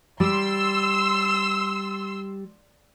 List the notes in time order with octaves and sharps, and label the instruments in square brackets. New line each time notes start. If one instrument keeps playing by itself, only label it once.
[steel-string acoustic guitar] G3 [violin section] C6 E6